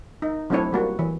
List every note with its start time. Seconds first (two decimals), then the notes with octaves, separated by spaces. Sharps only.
0.22 D#4
0.50 F#3 A3 C4 D4 E4 C#5
0.73 G3 A#3 F#4
0.99 E3